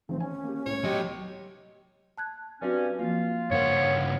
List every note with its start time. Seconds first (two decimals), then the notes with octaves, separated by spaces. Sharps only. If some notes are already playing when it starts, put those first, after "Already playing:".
0.09 A1 D#3 F3 C4
0.20 C#4 G#5
0.44 A#3 G4
0.66 C2 A2 C#5
0.84 F#3 G4 D#5
2.18 A5 F#6 G#6
2.62 G2 F#3 C4 C#4 F#4
2.99 F3 A#3 F4
3.51 G2 C#3 A#4 C5 C#5 F5 F#5